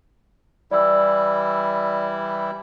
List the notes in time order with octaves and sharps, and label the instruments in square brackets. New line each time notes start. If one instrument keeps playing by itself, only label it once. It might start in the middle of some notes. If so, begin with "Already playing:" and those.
[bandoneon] E3 G3 E4 [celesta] D5 E6